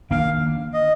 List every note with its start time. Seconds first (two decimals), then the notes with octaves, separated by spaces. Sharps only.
0.11 D#3 A#3 D4 F5
0.74 D#5